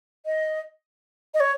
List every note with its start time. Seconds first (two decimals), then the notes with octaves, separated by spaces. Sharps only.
0.26 D#5
1.34 D#5
1.40 C#5